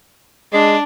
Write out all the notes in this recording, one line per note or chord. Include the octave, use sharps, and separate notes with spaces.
G#3 D4